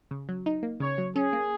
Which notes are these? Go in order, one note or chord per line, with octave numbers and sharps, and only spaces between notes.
C#3
F#3
D#4
A#3
C#3 C#5
F#3
C#4 G#4
A#3